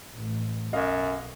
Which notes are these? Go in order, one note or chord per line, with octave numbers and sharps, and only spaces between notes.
A1
B1 F#2 D#5 F5